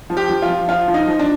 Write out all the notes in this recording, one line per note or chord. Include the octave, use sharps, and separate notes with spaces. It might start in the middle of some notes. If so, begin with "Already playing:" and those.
F3
G4
F3
F4
F3
F3 F4
F3
D#4
F3
D4